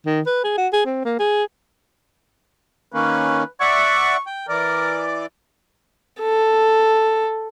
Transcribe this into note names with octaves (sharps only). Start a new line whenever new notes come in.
D#3
B4
G#4
F#4
G#4
C4
A#3
G#4
D#3 A#3 C#4 B4
D5 E5 F#5 C#6
G5
E3 A#4 D5
A4